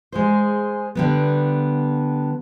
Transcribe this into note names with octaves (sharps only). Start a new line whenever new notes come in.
G#3 G#4 C5
D3 G3 B3